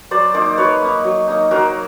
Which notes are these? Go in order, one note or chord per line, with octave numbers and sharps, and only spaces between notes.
F#3 C5 D5
A#3 D#4 C5 D5
F#3 B4 C#5
A#3 D#4
F#3
A#3 D#4
F#3 A#4 C5